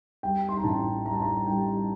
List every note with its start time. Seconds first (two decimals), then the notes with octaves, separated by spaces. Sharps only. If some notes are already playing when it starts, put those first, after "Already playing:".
0.23 G3 G5
0.49 C6
0.57 A#5
0.64 A1 A5
1.06 G3 A#5
1.13 A5
1.22 A#5
1.46 G3 G5